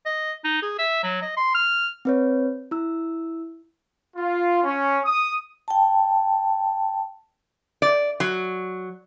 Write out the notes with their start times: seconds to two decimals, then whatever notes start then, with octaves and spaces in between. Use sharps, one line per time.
0.06 D#5
0.44 D#4
0.62 G#4
0.79 E5
1.03 F#3
1.22 D#5
1.37 C6
1.55 F6
2.05 C4 B4 C#5
2.71 E4 E6
4.17 F4
4.64 C#4
5.05 D#6
5.68 G5 A5
7.82 D5
8.20 F#3